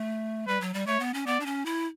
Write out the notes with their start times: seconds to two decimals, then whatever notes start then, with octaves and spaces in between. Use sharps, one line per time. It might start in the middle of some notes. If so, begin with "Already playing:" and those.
Already playing: A3
0.47 G3 B4
0.61 F#3
0.74 G3
0.87 A3 C#5
1.00 B3
1.14 C#4
1.26 B3 D5
1.40 D4
1.46 C#4
1.66 E4